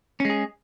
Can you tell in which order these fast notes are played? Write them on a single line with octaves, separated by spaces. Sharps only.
C#4 G#3 G#4